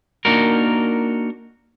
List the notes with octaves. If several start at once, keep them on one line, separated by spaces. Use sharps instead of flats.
A#3 D4 D#4 F#4 A#4